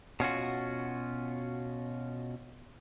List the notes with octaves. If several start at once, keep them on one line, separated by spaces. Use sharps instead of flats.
B2 C#4 F4 F#4